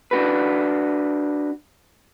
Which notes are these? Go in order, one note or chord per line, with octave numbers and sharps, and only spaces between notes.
D4 F#4 B4